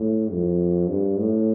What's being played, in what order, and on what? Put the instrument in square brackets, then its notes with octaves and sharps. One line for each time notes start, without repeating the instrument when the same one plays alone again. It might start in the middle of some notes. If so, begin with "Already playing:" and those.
Already playing: [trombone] A2
F2
G2
A2